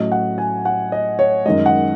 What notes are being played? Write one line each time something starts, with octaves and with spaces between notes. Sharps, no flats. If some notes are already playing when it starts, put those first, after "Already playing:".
Already playing: A2 F#3 A3 C#4 D#5
F#5
G#5
F#5
D#5
C#5
F#2 D#3 G#3 D#5
F#5